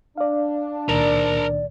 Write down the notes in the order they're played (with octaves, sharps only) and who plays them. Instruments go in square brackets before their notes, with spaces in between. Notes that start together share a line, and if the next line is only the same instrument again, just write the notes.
[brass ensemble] D4 [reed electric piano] D5 F5
[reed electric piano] C#2 A#2 D#3 [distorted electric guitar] A#4 A5 [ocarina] D5